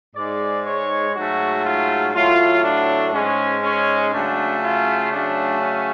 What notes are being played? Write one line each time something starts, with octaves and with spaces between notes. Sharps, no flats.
G#2 G#3 D5
C#5
G#2 F#3 A3 F#4
F4
A2 F#3 A3 F4
D4
G#2 G#3 C#4
C#4
C#3 F#3 A3 D4
F4
C#3 F#3 A3 D4
C#4